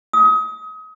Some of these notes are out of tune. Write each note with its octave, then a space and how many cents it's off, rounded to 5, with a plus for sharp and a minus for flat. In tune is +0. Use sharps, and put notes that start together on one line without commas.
D#6 +30